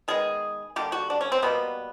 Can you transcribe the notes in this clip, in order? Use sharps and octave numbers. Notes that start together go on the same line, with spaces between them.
D#3 G#3 B3 G#4
D3 G3 A#3 G4
F#4
D4
C#4
C4
B2 G3 A#3 B3